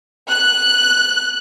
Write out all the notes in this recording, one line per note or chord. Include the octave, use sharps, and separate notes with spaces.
F#6